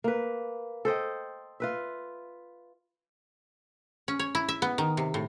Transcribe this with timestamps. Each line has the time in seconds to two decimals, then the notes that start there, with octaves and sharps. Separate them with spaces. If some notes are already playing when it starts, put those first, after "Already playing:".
0.04 A#3 B4
0.85 A4 C5 D#5 G5
1.60 F4 B4 E5
4.08 C#4
4.19 C#5
4.35 E4
4.49 E5
4.62 B3
4.78 D#3
4.97 C3
5.14 A2